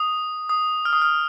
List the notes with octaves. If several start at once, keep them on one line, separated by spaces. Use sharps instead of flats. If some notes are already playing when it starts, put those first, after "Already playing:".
Already playing: D#6
D#6
F6
D#6
F6